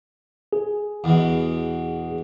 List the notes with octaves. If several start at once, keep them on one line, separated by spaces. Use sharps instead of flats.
G#4
E2 B2